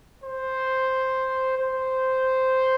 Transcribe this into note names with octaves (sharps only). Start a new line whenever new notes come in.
C5
C5